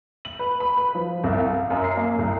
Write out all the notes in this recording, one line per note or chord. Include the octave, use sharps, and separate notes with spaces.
F#7
B4
B5
B4
F3
C2
F5
F#2
C7
A#3
C2